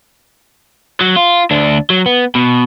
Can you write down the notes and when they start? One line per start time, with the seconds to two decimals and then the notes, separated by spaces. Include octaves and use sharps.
1.01 F#3
1.16 F4
1.51 D2 D4
1.90 F#3
2.06 B3
2.35 B2